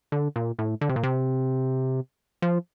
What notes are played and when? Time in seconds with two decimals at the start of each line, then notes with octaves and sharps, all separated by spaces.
0.12 D3
0.36 A#2
0.59 A2
0.81 D3
0.89 C3
0.96 A#2
1.03 C3
2.42 F3